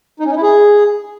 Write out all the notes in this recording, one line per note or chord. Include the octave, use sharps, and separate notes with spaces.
D#4
C#4
D#4
E4
G#4